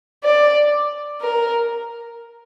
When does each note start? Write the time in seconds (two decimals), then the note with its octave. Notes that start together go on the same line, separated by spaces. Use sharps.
0.24 D5
1.22 A#4